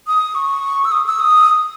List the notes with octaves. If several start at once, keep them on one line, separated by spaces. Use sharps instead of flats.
D#6
C#6
E6
D#6
E6
D#6